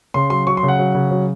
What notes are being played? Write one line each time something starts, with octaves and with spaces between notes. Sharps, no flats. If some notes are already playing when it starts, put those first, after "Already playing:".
C#3 C6
F#3 C6
F#3 C#6
C6
C#3
F#5
F#3
C#3
F#3